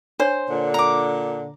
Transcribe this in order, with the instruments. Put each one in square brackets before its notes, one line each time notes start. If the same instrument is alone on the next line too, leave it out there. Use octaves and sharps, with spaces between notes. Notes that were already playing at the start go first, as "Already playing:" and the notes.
[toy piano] D4 C#5 [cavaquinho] C5
[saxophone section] A#2 D3
[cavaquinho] A#5 D6